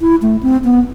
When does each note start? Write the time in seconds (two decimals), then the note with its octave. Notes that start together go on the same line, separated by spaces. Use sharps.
0.01 E4
0.22 A3
0.43 C4
0.64 B3